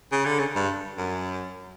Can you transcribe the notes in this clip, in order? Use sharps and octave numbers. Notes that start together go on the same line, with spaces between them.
C#3
D3
C#3
G2
F#2